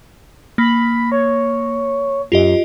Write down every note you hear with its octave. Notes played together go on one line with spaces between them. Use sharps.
A#3 B5
C#5
F#2 F4 G4 D#5